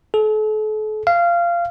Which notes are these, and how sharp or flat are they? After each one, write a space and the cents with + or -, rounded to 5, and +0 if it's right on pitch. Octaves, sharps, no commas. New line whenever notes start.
A4 -40
F5 -20